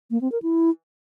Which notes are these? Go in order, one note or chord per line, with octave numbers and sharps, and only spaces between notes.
A#3
C4
A#4
E4